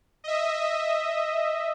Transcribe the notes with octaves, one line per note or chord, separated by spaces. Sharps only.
D#5 E5